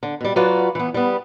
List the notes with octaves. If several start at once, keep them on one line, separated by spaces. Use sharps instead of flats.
D3
B2 G3
F#3 F4 F#4 B4 D5
E3 B3
G3 B3